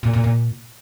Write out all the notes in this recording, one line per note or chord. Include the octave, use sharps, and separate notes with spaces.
A#2
A#2
A#2